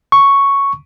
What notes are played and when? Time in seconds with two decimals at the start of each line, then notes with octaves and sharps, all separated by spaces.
0.12 C#6